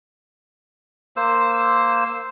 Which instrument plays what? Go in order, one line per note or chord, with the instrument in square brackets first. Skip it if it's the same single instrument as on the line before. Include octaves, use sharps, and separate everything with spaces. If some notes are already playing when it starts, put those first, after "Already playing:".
[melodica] A#3 C5 E6